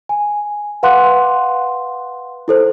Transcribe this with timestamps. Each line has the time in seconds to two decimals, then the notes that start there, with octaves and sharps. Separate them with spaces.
0.09 G#5
0.83 B4 F5 F#5 C6 D6 F#6
2.48 E4 A4 C5